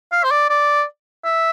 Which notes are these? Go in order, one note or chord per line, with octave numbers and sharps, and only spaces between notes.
F5
C5
D5
D5
E5